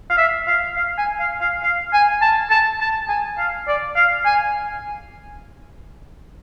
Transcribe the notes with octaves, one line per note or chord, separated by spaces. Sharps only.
F5
E5
F5
F5
G#5
F5
F5
F5
G#5
A5
A5
A5
G#5
F5
D5
F5
G#5